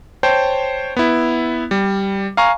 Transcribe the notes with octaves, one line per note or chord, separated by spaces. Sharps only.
C5 C#5 G5 A5
B3 E4
G3
F5 G#5 A#5 C#6